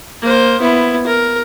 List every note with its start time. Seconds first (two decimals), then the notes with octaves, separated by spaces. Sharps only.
0.22 A#3 C5
0.60 B3 E4
1.06 A#4